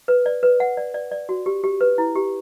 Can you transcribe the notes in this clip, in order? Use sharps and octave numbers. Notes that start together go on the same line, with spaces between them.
B4
D5
B4
F#5
D5
D5
D5
F#4
G4
G4
B4
E4
G4